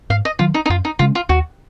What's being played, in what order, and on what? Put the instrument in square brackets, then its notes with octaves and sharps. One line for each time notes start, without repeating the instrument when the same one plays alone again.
[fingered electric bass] G#2 [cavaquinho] F5
[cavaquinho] D#5
[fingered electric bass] D#3 F#3 [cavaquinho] F4
[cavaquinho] D#4
D#4
[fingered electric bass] F#2 [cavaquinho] F4
[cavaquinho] D#4
[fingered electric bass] C#3 G#3 C#4 [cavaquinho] F4
[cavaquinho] F4
[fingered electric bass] D#2 [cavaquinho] F#4